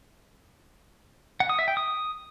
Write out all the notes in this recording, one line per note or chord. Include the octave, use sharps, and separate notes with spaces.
F#5
D#6
E5
G5
D#6